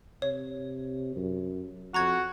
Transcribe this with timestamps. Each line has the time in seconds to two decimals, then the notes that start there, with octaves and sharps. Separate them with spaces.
0.22 C3 C#5
1.16 F#2
1.94 F2 F#4 A#5 C#6 G#6